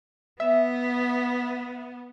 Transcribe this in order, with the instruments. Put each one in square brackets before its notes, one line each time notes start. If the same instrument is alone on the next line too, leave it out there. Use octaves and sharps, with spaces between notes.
[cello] B3 [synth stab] E5